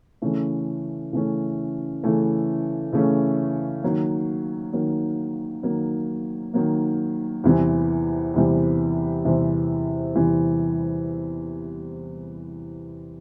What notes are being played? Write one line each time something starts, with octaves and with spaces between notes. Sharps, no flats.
C#3 E3 A3 C#4
C#3 E3 A3 C#4
C#3 E3 A3 C#4
C#3 E3 A3 C#4
D#3 F#3 A#3
D#3 F#3 A#3
D#3 F#3 A#3
D#3 F#3 A#3
E2 C3 E3 G3 C4
E2 C3 E3 G3 C4
E2 C3 E3 G3 C4
E2 C3 E3 G3 C4